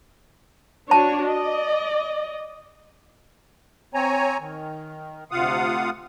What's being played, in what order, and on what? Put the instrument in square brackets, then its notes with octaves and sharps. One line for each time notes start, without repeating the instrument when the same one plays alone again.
[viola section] D4 F#4 C#5 [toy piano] A5
[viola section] D5 D#5
[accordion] C4 C#5 G#5 A#5
D#3
D2 C3 F4 F5 F#5 D#6